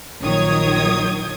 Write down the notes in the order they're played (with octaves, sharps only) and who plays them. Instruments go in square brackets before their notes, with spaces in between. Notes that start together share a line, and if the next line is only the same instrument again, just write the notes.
[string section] A#1 D#3 F#3 C#5 D#6 G#6